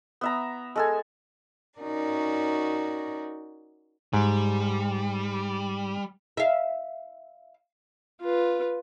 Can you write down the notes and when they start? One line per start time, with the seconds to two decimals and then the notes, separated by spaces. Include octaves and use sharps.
0.21 B3 E5 A#5
0.76 G#3 A4 G#5
1.80 C#4 D#4 F#4 A#4 D5
4.13 G#2 G3
6.37 E5 F5
8.21 F4 B4